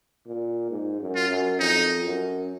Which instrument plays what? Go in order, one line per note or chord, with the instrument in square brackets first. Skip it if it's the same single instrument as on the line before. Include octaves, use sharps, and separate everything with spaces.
[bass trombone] A#2
G#2
F#2
[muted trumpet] F4
[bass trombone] F#2
[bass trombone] F2 [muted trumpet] D#4
[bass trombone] F#2